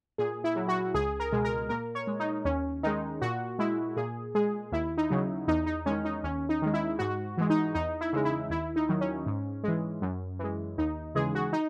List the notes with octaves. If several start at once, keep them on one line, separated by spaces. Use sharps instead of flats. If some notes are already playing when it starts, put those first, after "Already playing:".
A#2 G#4
E4
F#3
F#4
C#2 G#4
A#4
B2 G#3
A#4
A#2 A#4
C#5
G#3
D#4
D#2 C#4
D#3 G#3 D#4
A#2 F#4
G#3 E4
A#2 G#4
G#3 G#4
D#2 E4
D#4
C#3 F#3
E2 D#4
D#4
D#3 G#3 C#4
D#4
D#2 C#4
D#4
D#3 G#3
E4
G#2 F#4
E3 G#3
D#4
E2 D#4
E4
C#3 G#3
E4
D#2 E4
D#4
D#3 F#3
C#4
G#2
E3 G#3
F#2
E3 G#3
D#2 D#4
C#3 E3 G#3 G#4
F#4
D#4